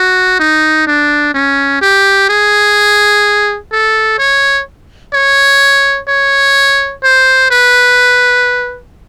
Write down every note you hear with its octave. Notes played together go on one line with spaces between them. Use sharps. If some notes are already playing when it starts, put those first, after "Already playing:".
Already playing: F#4
D#4
D4
C#4
G4
G#4
A4
C#5
C#5
C#5
C5
B4